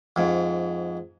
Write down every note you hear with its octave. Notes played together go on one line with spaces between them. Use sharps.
F2 G#2